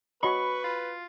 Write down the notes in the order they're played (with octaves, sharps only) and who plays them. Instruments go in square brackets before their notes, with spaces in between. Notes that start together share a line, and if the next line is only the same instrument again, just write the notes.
[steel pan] F#4 C#5 D#5 [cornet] B4 [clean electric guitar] B5 [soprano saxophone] C#6
[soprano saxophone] F4